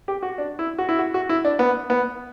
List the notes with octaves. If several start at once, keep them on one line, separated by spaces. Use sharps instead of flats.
G4
F#4
D4
E4
F#4
E4
F#4
F#4
E4
D4
B3
B3